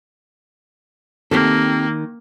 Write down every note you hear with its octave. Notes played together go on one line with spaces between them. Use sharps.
D#3 A#3 C4 G4 A4